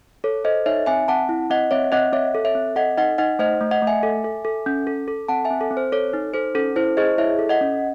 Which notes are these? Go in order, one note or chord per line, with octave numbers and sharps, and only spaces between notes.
A4 C#5
A4 C5 D#5
D#4 C#5 E5
C4 E5 G#5
C4 F#5 A5
E4
C4 D#5 F#5
C4 C#5 E5
C4 D#5 F#5
C4 C#5 E5
A4
C#5 E5
C4
A4 D#5 F#5
D#4 D#5 F#5
D#4 D#5 F#5
A3 C5 D#5
A3
D#5 F#5
A3
E5 G#5
A4
A4
A4
C#4
A4
A4
C4 F#5 A5
E5 G#5
C4
A4
C4
C5
A4 C#5
D#4
A4 C5
C#4 A4
E4 C5
G#4 C5 D#5
E4 C#5 E5
A4
D#5 F#5
C#4